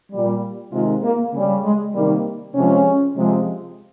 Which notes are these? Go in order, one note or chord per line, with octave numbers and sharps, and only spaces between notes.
A#2 G3
C3 D#3 G#3 F4
A#3
C#3 G3
G#3
C3 D#3 G3 A#3
C3 F3 G#3 C#4
C3 F3 G#3